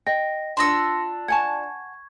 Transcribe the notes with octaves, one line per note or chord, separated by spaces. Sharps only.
D#5 G5 A#6
D4 F4 C6 E6 A#6 C#7
F#5 G#5 A5 C#6 G#6